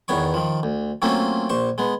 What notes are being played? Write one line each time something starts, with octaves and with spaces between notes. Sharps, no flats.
E2 D#3 B3 C#5 C#6
D#3 F3
D2
F#3 A3 A#3 C4 C#4 F4
A#1 C5 C#6
G#3 B3